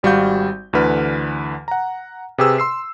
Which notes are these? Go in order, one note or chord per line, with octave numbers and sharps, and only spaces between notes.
G#1 G3 F#4 F5 G6
D2 D3 E3 B4 F6
F#5 A#5
C3 G4 G#4 B4 E6
C6 E6 C7